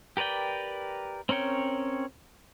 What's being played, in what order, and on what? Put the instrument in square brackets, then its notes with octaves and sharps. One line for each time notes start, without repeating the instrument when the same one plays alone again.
[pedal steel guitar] G4 A#4 B4 D5 G5
C4 C#4 A#4 C#5 G5